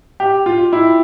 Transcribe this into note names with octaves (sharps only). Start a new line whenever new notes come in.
G4
F4
E4